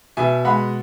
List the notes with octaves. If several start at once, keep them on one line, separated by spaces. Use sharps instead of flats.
B2 E5 G#5
G#3 F#5 B5